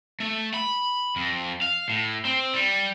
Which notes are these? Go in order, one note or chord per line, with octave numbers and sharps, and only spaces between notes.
A3
B5
F2
F5
A2
C4
G3